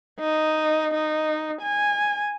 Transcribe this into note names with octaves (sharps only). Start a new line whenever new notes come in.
D#4
D#4
G#5